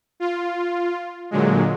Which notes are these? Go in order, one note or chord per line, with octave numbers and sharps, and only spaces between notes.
F4
A#2 D3 F#3 G#3